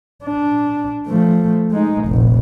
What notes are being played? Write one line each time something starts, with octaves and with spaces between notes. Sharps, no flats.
D4
F3 A3
G#3 D#4
F1 A#1